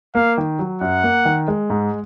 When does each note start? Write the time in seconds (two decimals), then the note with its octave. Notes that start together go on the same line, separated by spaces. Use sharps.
0.15 A#3 F5
0.38 D#3
0.59 F#3
0.81 F#2 F#5
1.03 A#3
1.25 D#3
1.48 G#3
1.70 G#2